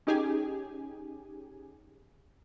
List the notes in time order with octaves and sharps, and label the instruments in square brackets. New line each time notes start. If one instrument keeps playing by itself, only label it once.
[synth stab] C#4 D#4 G4 G#4 G#5